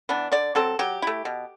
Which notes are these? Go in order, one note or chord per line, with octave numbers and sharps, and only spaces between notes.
E3 B3 D4
D3 D5
F#3 C4 A4
F#3 G4
A3 E4
B2